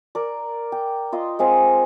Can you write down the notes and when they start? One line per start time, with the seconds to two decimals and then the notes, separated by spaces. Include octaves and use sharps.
0.15 A#4 D5
0.72 G5
1.12 F4 D#5 C6
1.39 G#3 C4 G#4 F5